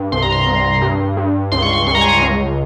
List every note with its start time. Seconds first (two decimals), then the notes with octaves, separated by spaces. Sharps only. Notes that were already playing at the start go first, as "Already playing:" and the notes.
Already playing: G2
0.12 C2 C6
0.22 A#5
0.32 C6
0.47 C2
0.82 G2
1.17 G2
1.52 C#2 C6
1.62 C#6
1.73 C6
1.87 C#2 C6
1.95 A#5
2.01 G#5
2.09 A#5
2.22 C#2